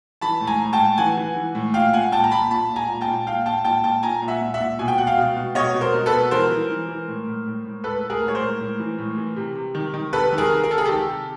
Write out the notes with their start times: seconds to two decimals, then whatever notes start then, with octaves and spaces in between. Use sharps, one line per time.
0.21 E3 A5 B5
0.41 A2
0.47 G#5 A#5
0.61 A2
0.73 G5 A5
0.79 A2
0.98 E3 F#5 G#5
1.17 E3
1.36 E3
1.55 A2
1.74 A#2 F5 G5
1.93 A#2 F#5 G#5
2.12 A#2 G5 A5
2.24 A#5
2.31 A#2 A5 B5
2.51 A#2 A5 B5
2.69 A#2
2.76 G#5 A#5
2.89 A#2
3.01 G5 A5
3.08 A#2
3.26 A#2 F5 G5
3.46 A#2 G5 A5
3.64 A#2 G5 A5
3.84 A#2 G5 A5
4.03 A#2 G#5 A#5
4.22 A#2
4.28 E5 F#5
4.41 A#2
4.54 E5 F#5
4.60 A#2
4.79 B2 G#5
4.88 G5
4.98 B2 F#5
5.07 F5 G5
5.17 B2
5.36 B2
5.55 B2 C#5 D#5
5.74 B2
5.81 A#4 C5
5.94 B2
6.06 A4 B4
6.12 B2
6.31 E3 A#4 C5
6.51 E3
6.69 E3
6.88 E3
7.08 A2
7.27 A2
7.46 A2
7.65 A2
7.84 A2 A4 B4
8.03 A2
8.10 G#4 A#4
8.23 A2
8.28 C#5
8.35 A#4 C5
8.41 A2
8.60 A2
8.80 E3
8.98 A2
9.17 E3
9.36 C3
9.55 C3
9.75 D#3
9.94 D#3
10.13 C3 A4 B4
10.32 D#3
10.38 G#4 A#4
10.50 D#3
10.64 A#4
10.70 C3 A4
10.78 G#4
10.85 D#3 G4 A4
11.07 C3